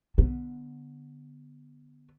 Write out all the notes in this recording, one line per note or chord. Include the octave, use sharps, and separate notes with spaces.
D3 B3